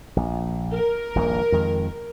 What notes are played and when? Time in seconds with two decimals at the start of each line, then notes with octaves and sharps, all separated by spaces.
0.16 A#1
0.73 A#4
1.16 D#1 A#1 G#2
1.52 F2 D#3 G#3